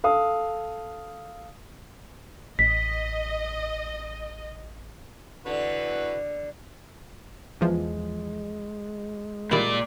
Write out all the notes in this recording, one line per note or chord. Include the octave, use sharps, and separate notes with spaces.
A4 F5 D#6
A1 D#5 B6
D3 E3 F#4 B4
E2 E3 F3 G#3
A#2 D#3 G3 E4 D5